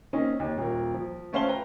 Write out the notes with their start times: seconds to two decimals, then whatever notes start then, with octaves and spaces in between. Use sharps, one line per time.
0.13 A#3 C4 C#4 D#4
0.40 D#2
0.58 D#1 A#4
0.94 F3
1.33 A3 C#4 C5 F5 A5 G7
1.48 B4 G5 A#5